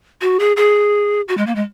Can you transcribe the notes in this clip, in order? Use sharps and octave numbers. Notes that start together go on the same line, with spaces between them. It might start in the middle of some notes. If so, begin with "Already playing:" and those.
F#4
G#4
G#4
F#4
G#3
A#3
G#3